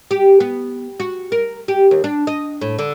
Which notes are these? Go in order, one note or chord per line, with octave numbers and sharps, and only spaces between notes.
G4
B3
F#4
A#4
G4
D#2
D4
D#5
A2
D3